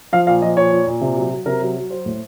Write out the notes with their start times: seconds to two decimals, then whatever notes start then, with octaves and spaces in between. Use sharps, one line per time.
0.13 F3 F5
0.27 A#2 F5
0.42 F3 D#5
0.57 A#2 C#5
0.72 A#2
0.87 A#2
1.01 C3
1.17 F#3
1.32 F#3
1.46 C3 A#4
1.61 F#3
1.76 F#3
1.91 F#3 C5
2.06 A2